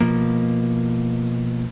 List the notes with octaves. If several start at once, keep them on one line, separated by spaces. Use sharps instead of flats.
B2 F3 A#3